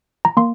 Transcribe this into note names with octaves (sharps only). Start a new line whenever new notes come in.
A#5
A#3 C6